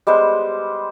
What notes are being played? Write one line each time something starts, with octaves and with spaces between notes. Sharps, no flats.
G3 G#3 B3 C5